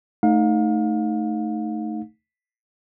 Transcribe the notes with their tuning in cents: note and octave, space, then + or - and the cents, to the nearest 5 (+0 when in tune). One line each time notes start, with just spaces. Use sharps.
A3 +0 D#4 +0 F5 +35